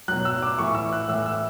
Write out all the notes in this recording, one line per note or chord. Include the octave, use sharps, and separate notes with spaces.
B2 F#3 F#6
E6
D6
A2 E3 C#6
E6
F#6
A2 E3 E6
E6